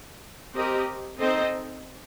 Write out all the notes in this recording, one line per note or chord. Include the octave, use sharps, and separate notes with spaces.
C4 G4 A#4 D#5
C4 D#4 A4 C5 D#5